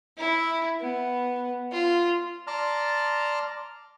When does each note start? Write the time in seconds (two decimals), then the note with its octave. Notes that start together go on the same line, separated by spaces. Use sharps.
0.18 E4
0.80 B3
1.72 F4
2.47 D5 A5 A#5 C6 F6